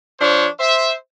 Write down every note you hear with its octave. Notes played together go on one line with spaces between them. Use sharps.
F3 D4 C5 C#5
C5 E5